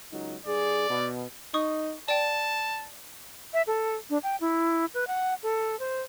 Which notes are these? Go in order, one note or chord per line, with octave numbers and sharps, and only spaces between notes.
C#2 F#3 D#4
G2 G#4 D5
B2
D#4 C#6 D#6
D5 G5 A5
E5
A4
D4
G5
E4
B4
F#5
A4
C5